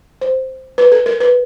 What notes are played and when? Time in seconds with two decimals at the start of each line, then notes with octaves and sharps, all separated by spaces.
0.21 C5
0.78 B4
0.92 A4
1.06 A#4
1.20 B4